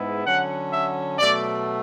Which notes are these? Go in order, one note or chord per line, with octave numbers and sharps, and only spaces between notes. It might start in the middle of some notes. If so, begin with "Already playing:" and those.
Already playing: G#2 G#3 B3 E4
D3 F#3 C#4 F#5
E5
B2 F#3 A3 D5